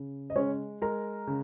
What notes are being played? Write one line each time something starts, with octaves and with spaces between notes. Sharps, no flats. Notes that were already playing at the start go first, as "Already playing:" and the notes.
Already playing: C#3
D#5
G#3 C#4 C#5
G#3 A#4 A#5
C#3